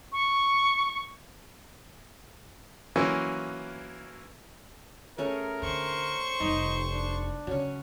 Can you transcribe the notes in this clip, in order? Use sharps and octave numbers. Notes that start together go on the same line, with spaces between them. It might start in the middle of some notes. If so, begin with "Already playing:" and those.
C#6
E3 F#3 A#3 C#4 F4
A3 C#4 G#4 A#4
D3 C5 C#6
F1 G3 D#4
D4
C#3 F#3 C#4